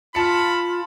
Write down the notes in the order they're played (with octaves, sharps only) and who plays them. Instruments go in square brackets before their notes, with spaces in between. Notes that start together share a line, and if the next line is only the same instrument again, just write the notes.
[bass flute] F4 [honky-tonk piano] A5 C#7 [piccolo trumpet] B5